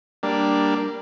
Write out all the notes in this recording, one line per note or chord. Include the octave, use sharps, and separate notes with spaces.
G3 A#3 D4